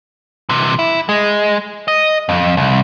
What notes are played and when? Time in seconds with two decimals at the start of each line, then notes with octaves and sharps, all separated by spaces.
0.49 C3 E3
0.79 E4
1.09 G#3
1.88 D#5
2.29 F2
2.57 C2